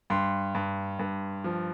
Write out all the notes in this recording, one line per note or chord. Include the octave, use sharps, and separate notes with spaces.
G2 C6
G2
G2
F3